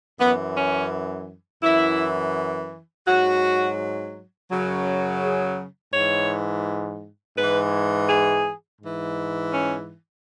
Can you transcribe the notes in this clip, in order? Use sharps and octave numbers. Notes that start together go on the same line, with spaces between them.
F#2 E3 B3
C#4
F#2 E3 E4
G#2 F#3 F#4
F#2 C#3 F#3
G#4
G#2 E3 C#5
G#2 E3 B4
G#4
G#2 E3
C#4